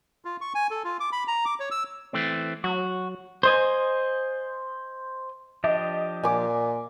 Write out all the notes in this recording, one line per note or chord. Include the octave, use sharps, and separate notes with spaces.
F4
C#6
G#5
A4
F4
D6
B5
A#5
D6
C#5
E6
E3 A3 C4
F#3 F#4
C5 D#5 G#5
F3 D4 G4 D#5
A#2 G#5 D6